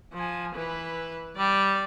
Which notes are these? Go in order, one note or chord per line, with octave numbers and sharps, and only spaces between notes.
F3 G#5
E3 B4
G3 D5